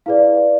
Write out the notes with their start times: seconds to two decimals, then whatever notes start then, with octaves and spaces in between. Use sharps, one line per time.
0.06 E4 G#4 B4 D5 F5